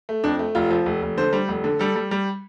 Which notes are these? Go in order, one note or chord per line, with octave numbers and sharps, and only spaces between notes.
A3
F2 D4
A3
F1 F4
F3
F1
F1
D3 C5
G3
F1
D3
G3 A4
G3
G3